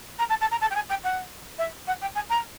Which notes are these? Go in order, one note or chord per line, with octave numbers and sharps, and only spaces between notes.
A#5
A5
A5
A#5
A5
G5
G#5
G5
F#5
E5
F#5
G5
G#5
A#5